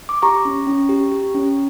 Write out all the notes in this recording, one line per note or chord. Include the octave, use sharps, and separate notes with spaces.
D6
G4 A#5 C#6
C#4
C#4
G4
G4
C#4